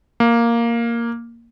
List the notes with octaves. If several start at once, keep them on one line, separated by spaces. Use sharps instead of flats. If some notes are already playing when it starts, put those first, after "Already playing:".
A#3